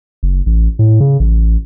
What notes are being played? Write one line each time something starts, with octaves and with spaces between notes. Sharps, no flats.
F#1
A1
A2
C#3
A1